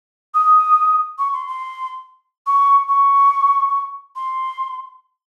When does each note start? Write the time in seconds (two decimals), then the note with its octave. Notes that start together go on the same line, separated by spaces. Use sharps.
0.34 D#6
1.18 C#6
1.33 C6
1.47 C6
2.46 C#6
2.88 C#6
4.16 C6